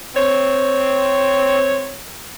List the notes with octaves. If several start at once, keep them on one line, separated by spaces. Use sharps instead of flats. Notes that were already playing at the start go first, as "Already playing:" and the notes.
C4 C#5